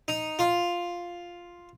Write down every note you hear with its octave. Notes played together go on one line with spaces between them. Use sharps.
D#4
F4